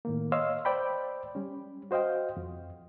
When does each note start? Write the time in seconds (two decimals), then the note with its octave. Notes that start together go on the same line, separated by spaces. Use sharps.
0.05 A2 D#3 A#3
0.32 C#5 D#5 F5 C6 E6
0.65 C5 D5 G5 B5
1.35 G3 C#4
1.91 F#4 C5 D#5 F5 G5
2.37 F2